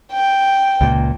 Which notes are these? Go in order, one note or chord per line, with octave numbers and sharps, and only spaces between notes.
G5
C#2 A#2